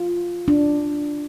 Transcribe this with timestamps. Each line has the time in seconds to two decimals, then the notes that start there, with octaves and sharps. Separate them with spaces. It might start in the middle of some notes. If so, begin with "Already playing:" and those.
Already playing: F4
0.48 D4